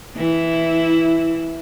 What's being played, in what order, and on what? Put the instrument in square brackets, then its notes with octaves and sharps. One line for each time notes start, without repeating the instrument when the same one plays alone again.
[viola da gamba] E3 E4